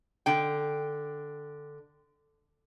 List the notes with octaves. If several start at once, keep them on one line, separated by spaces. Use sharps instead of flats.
D3 G5